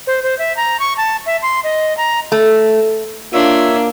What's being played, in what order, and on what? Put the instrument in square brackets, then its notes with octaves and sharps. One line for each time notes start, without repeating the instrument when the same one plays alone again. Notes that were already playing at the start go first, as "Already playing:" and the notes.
[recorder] C5
C5
E5
A#5
C#6
A5
E5
C6
D#5
A#5
[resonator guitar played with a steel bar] A3
[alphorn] A#3 [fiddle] D4 [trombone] F4 [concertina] C#5 E5 E6